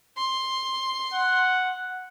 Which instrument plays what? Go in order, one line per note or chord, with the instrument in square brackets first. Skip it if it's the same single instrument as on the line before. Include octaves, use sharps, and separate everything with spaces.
[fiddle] C6
[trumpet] F#5